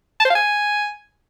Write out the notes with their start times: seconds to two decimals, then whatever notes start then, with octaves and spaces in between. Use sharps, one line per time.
0.20 A5
0.25 C5
0.30 F5
0.35 G#5